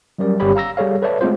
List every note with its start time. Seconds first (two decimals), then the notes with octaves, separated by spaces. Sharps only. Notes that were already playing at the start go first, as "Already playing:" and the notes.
0.18 F#3 G3 C#4 A#4 D5
0.40 G1 G3 C#4 G4 C#5 B5
0.56 F5 A#5 E6 A#6
0.77 G3 G#4 A4 C#5 F5
1.02 A4 B4 C#5 D5 E5 A5
1.21 G#3 A3 C4 F4 C5